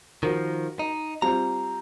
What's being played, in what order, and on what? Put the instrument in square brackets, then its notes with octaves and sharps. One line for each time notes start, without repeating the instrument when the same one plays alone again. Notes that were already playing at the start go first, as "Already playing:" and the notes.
[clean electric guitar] D#3 F3 [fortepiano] F#4 A#4
[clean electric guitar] D#4
[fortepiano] G3 C4 F4 [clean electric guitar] A#5